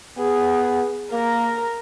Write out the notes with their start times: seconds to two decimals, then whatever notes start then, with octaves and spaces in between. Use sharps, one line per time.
0.18 B3 G#4
1.12 A#3 A#4